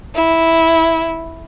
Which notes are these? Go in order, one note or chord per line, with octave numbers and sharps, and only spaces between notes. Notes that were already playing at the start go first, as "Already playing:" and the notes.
E4